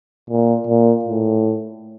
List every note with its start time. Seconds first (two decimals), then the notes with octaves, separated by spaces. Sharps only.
0.30 A#2
0.67 A#2
1.04 A2